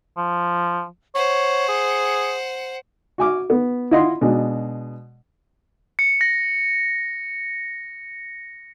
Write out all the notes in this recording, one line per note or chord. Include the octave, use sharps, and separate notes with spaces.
F3
C5 C#5 F#5
G#4
F#4 G#5 D6 F6
B3
E4 F4 D#5 F#5 C6
B2 G#3 D4
C#7
A#6